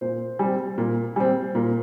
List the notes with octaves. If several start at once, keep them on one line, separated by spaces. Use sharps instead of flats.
A#2 C5
G3 C4
A#2
G3 C4
A#2